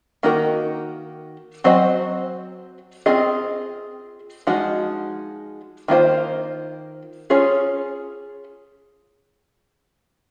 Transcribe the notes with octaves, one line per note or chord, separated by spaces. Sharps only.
D#3 A#3 D#4 F#4 A#4
F#3 C4 F#4 C5 D#5
C4 F4 G#4 D#5
F3 G#3 D#4 F#4
D#3 A#3 F4 C5
C#4 F4 G#4 C#5